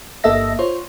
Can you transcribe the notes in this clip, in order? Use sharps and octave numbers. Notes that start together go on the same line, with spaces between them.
G1 A#3 A4 D#5 E5 A#6
F4 C5 C#5